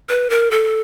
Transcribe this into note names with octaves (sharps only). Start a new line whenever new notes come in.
B4
A#4
A4